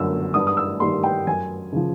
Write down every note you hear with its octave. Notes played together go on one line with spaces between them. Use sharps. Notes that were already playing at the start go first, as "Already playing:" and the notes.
Already playing: G1 F#2 D3 E6
G2 D#6
D#6
E6
D#3 G3 A#3 C6
G5
F#2 G#5
C#3 F3